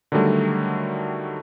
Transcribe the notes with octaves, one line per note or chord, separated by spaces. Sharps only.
D3 D#3 F#3 G3 A3